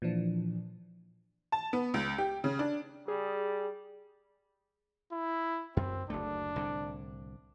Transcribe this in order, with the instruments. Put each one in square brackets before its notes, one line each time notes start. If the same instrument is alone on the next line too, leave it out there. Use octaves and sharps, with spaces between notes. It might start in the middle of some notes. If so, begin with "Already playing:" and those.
[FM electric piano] A#2 E3 F3 D4
[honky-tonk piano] A5
B3
C#2
G4
C#3
D4
[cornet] G3 [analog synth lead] G#4
[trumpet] E4
[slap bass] F#2 [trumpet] C4
[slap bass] F#1 D2 A3 [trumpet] D4
[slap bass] C2 A2 D3